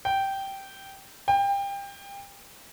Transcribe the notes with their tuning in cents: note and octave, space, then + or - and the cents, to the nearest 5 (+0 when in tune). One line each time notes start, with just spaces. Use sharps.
G5 -10
G5 +25